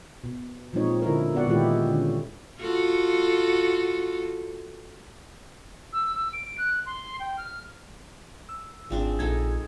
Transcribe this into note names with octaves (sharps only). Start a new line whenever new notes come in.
B2
A#2 F3 G#3 C4 D#4 C#5
D3 E4 A#4
B3 F#4 D5 F#5
A#2 D#3 G#3 E4 G4
D3 C#4
F4 F#4 A4
E6
E6
D7
F#6
C6
G5
F6
E6
G#1 F3 C4 D4 G#4
A#1 G#3 D#4 A4 G#6